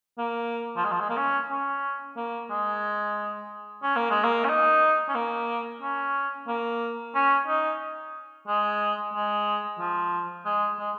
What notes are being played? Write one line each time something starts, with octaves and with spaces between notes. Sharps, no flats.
A#3
F3
G#3
F3
G#3
A#3
C#4
C#4
A#3
G#3
C#4
A#3
G#3
A#3
C#4
D#4
C#4
A#3
C#4
A#3
C#4
D#4
G#3
G#3
F3
G#3
G#3